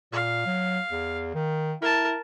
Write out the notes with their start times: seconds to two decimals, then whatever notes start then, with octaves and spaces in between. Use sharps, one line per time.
0.13 A#2 F5
0.46 F#3
0.92 E2
1.34 D#3
1.82 E4 A#4 A5